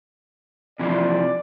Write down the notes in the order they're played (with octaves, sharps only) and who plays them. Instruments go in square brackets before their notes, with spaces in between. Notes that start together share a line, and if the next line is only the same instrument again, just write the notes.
[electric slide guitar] C3 E3 F3 [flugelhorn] D5